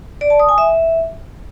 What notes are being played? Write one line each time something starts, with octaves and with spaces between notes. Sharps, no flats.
D5
A5
D#6
G#5
E5